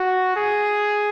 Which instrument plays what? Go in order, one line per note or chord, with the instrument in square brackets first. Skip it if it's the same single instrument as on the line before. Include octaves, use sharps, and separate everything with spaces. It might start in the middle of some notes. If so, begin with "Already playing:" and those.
Already playing: [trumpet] F#4
G#4